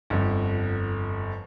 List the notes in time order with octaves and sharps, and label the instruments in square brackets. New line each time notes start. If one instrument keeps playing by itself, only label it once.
[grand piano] G1 F2